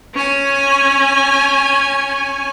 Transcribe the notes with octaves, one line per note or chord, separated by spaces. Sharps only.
C#4 G#5